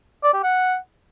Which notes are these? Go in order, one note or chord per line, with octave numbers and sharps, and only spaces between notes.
D5
G4
F#5